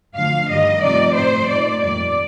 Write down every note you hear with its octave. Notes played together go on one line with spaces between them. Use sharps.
D2 D3 F3 F5
G2 D#3 G3 D#5
C3 F3 A3 C4 D#4 D5
A2 A3 C4 D#4 C5
A#2 A3 D#4 D5
F2 D#3 G3 D5